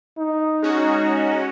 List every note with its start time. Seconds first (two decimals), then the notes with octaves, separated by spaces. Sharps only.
0.18 D#4
0.62 G#3 C#4 F#4